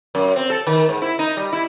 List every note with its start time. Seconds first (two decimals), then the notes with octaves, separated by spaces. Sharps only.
0.15 F#2
0.36 C4
0.50 A4
0.67 D#3
0.89 G#2
1.02 E4
1.19 D#4
1.37 G3
1.53 E4